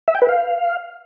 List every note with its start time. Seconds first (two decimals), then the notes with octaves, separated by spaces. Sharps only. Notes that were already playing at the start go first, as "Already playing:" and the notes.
0.08 E5
0.15 G5
0.22 B4
0.29 F5